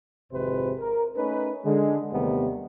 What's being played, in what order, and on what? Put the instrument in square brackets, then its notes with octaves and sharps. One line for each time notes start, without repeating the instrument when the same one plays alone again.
[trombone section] G#1 F2 C3 G#3 B4 C5
A#4
A3 C#4 D#4 B4
D3 G#3
D#2 C3 D#3 G3 A3 B3